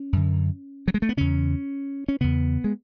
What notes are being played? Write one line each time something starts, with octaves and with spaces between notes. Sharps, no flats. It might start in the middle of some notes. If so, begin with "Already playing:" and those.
Already playing: C#4
F#2 D3
F#3
G#3
A3
B3
E2 C#3 C#4
C#4
E2 C#3 B3
G#3